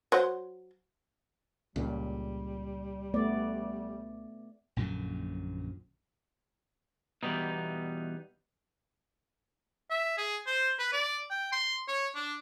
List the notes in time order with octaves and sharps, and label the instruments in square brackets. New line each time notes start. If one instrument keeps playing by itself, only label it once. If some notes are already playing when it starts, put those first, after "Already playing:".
[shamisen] F#3 C5 F#5
[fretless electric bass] C#2 A#2 [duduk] G3
[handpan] A3 B3 D5
[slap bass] A#1 F#2 A#2 D3
[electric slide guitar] E2 B2 [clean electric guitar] G3 B3 D#4
[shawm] E5
G#4
C5
B4
D5
G5
C6
C#5
D4